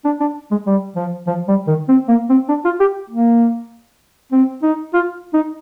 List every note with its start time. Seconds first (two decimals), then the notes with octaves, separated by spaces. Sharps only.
0.05 D4
0.20 D4
0.51 G#3
0.66 G3
0.96 F3
1.27 F3
1.48 G3
1.67 D#3
1.89 C4
2.09 A#3
2.29 C4
2.49 D4
2.65 F4
2.80 G4
3.10 A#3
4.32 C4
4.63 D#4
4.94 F4
5.34 D#4